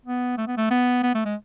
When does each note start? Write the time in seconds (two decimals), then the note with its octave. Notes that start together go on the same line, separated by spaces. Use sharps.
0.06 B3
0.38 A3
0.48 B3
0.57 A3
0.71 B3
1.03 B3
1.15 A3
1.25 G#3